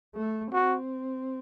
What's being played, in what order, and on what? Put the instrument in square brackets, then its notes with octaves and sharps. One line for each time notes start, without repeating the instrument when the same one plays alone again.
[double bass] A3
[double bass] C4 [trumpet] F#4